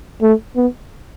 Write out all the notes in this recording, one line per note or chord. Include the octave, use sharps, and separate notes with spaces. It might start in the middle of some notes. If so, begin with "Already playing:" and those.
A3
B3